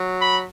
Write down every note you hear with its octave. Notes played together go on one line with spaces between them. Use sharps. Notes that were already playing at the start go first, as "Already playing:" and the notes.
Already playing: F#3
B5